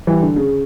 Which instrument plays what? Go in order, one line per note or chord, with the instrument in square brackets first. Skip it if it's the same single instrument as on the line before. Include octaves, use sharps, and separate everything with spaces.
[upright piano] E3 G3
D3
C#3